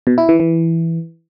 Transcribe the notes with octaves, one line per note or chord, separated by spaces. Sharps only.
B2
E4
E3
E3